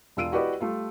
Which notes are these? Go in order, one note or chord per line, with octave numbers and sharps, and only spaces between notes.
E1 F4 E6 D7 D#7
E4 F#4 G4 B4 D5 D#5
G3 A3 F4